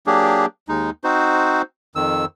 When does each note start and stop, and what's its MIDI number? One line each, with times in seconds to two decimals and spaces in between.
0.07 0.46 54
0.07 0.46 58
0.07 0.46 62
0.07 0.46 67
0.07 0.46 68
0.69 0.90 39
0.69 0.90 56
0.69 0.90 63
1.04 1.62 60
1.04 1.62 63
1.04 1.62 66
1.04 1.62 72
1.95 2.25 41
1.95 2.25 51
1.95 2.25 88